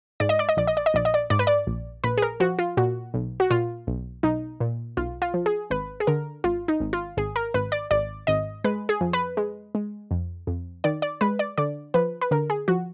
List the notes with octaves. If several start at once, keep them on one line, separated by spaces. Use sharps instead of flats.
G#2 D5
D#5
D5
D#5
A#1 D5
D#5
D5
D#5
A#1 D5
D#5
D5
G#2 D5
B4
D5
A#1
A#1 B4
G#4
A#4
F3 F#4
F4
A#2 F#4
B1
F#4
A#2 F4
B1
B1 D#4
A#2
B1 F4
F4
F3
G#4
G#1 B4
G#4
D3 A#4
G#1 F4
D#4
G#1
F4
G#1 G#4
A#4
G#1 B4
D5
G#1 D5
G#1 D#5
G#3 B4
G#4
F2
B4
G#3
G#3
F2
F2
D#3 D5
D5
G#3 B4
D5
D3 D5
F3 B4
B4
D3 A#4
G#4
F3 F#4